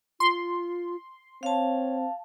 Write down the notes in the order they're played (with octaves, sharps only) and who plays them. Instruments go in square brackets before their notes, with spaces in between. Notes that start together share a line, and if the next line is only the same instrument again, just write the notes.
[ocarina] F4 [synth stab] C6
[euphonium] C4 [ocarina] C#5 [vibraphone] F5 A5